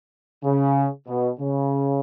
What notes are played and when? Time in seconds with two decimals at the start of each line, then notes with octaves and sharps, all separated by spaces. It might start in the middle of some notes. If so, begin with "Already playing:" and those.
0.44 C#3
1.08 B2
1.40 C#3